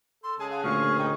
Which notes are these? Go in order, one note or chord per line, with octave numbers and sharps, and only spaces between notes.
A4 C6
C#3 G#3 G#4 A5
F5 F#5
D2 A#2 F5 C#6
D#4 G5